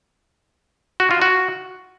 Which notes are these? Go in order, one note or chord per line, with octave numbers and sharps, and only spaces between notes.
F#4
F4
F#4